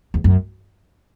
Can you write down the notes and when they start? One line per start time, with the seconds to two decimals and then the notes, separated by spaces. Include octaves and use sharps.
0.14 E2
0.24 F#2